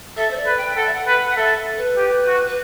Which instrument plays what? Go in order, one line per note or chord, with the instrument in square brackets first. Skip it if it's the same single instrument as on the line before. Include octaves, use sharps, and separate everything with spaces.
[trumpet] A4 [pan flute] E5
[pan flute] C5
D5
[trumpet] B4
[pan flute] G5
[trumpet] A4 [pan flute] F#5
[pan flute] E5
F#5
[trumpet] B4
[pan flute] F#5
[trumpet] A4 [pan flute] E5
[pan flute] B4
[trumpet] G4
F#4
[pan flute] B4